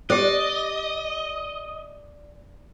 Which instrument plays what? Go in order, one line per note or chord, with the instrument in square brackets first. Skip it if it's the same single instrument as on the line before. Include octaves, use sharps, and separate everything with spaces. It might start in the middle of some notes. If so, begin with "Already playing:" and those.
[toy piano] G4 C5 [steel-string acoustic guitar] D5 [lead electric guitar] D#5